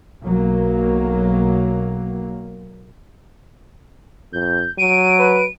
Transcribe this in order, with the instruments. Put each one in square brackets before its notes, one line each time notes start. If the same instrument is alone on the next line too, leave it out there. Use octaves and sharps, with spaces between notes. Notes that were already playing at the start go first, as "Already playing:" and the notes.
[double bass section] B1 F#3 A#3
[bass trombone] F2 [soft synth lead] G6
[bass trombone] F#3 [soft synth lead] D7 [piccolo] D#7
[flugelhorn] B4